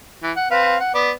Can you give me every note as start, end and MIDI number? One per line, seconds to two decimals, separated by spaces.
0.23 0.31 52
0.36 0.49 78
0.51 0.76 60
0.51 0.76 71
0.51 0.76 77
0.80 0.90 78
0.94 1.12 59
0.94 1.12 74